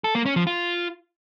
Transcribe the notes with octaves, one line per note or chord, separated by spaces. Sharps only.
A4
A#3
C#4
F3
F4